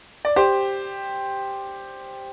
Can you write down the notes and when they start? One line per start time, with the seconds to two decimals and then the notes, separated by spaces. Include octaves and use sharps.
0.25 D5
0.36 G4 C5